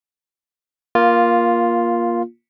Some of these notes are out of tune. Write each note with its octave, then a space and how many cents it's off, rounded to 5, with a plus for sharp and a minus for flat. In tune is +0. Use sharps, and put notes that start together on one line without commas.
A#3 +15 F4 +0